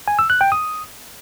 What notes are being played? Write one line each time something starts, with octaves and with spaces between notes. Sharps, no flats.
G#5
E6
F#6
G5
D#6